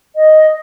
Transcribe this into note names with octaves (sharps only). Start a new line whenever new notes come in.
D#5